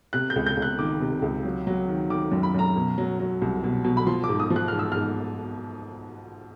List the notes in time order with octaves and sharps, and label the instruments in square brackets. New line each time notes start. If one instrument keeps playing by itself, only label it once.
[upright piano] C3 F#6
G6
C#2
G6
C#2
F#6
D#3 D6
C3
C#2
F#3
F#3
D#3
D#3 D6
F#2
B5
F#2 A#5
B2
F#3
F#3
C2
B2
B2
B5
F3 C6
D6
G#2
D#6
F3
F#6
G#2 F6
E6
G#2 F6